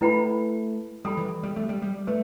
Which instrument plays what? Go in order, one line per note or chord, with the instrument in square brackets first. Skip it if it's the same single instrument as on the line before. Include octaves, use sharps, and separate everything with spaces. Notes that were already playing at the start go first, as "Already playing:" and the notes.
[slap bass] A3 [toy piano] E4 B4 G5 B5
[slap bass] G3 [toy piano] A4 G5 B5
[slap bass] E3
G3
A3
G3
G3
[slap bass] A3 [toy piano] B4